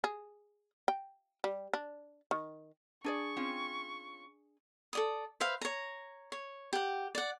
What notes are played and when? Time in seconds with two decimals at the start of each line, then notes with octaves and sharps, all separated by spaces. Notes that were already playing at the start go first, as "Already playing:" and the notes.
0.04 G#4
0.88 G5
1.44 G3
1.73 D4
2.31 D#3
3.04 D4 G#4 D5 C#6
3.37 C4 C#4 F4
4.93 A4 D5 D#6
5.40 B4 C5 E5 F5
5.61 C#5 A#5
6.32 C#5
6.73 G4 F#5
7.15 D5 F#5